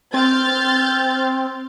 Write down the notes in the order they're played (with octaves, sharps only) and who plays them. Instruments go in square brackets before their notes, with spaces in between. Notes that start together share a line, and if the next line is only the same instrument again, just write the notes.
[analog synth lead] C4 [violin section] F6 G6 A6